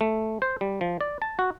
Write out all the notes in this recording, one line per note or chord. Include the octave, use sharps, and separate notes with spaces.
A3
C5
G3
F3
D5
A5
F#4